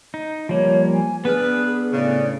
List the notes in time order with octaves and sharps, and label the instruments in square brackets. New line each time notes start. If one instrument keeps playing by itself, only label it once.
[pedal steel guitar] D#4
[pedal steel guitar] F3 G3 A#3 [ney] C#5
[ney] G#5
[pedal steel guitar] B3 D4 F6 [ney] G#4 [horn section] B4
[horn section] A2 C#3 [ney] D5